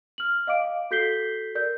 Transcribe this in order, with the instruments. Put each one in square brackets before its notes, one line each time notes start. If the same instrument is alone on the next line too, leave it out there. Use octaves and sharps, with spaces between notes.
[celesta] F6 F#7
D#5 F5 D6 D7
F#4 A4 G6 B6 C7 G7
A#4 D5 G6